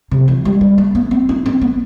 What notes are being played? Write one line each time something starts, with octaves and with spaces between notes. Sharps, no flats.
C3
E3
G3
G3
A3
B3
C4
D#4
C4
B3